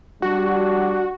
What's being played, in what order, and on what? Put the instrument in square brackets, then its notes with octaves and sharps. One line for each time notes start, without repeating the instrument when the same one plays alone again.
[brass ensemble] G3 D4 [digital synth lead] F#4